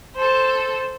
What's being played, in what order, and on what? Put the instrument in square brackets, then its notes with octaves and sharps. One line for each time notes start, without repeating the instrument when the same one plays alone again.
[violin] A4 C5